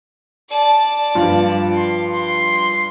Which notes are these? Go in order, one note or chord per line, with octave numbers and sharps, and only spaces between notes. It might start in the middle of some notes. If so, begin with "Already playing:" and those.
D5 A5
G2 F3
C6
C6